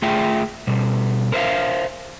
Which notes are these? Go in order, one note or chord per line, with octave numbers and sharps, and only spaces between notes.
A3 F4 G#4 E5 G5
B2 G3
A#4 C5 E5 F5